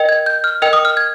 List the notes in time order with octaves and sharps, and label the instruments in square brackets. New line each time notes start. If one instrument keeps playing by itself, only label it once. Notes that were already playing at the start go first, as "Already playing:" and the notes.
Already playing: [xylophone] A#4 D#5 G5
G#6
G6
F6
A#4 D#5 G5 F6
D#6
F6
G#6